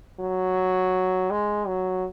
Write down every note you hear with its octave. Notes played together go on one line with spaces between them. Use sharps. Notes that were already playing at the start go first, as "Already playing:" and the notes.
F#3
G#3
F#3